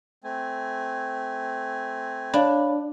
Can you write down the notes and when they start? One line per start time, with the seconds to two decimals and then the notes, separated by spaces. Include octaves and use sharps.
0.24 A3 C4 G#5
2.34 D4 C#5 F5 B5